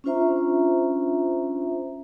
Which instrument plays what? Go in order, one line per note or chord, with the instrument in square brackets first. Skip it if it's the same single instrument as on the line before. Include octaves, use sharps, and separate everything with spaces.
[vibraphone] C#4 D4 F4 C5 E5 A#5